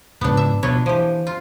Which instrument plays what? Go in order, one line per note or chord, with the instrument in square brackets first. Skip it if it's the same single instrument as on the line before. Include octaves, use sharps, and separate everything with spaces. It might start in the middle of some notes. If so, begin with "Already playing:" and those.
[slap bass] G#2 C#3 F3 [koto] B3 D4
[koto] E5
[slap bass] B2 F3 [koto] D4 E4 C#5
[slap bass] E3 [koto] F3 G4
[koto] F4